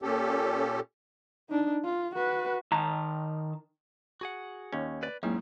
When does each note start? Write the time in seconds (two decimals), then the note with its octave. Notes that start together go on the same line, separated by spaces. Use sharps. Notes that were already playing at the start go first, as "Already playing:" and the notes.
0.02 A#2 C#4 G4 A4
1.49 D4 D#4
1.84 F4
2.15 F#4 B4
2.72 D#3 A5 A#5
4.21 F#4 G#4 F#5
4.73 D#2 C#4
5.03 B4 D5
5.23 E2 G#2 F#3 A#3 C4 C#4 E4